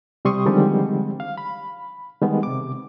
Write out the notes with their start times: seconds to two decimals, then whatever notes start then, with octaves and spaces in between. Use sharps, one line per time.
0.25 C3 G3 C6 C#6 D#6
0.46 D3 D#3 F3 G3 G#3 C4
1.20 F5
1.38 B5
2.21 D#3 G3 G#3 B3
2.43 C3 D6